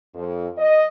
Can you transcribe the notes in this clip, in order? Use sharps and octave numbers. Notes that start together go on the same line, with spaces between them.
F2
D#5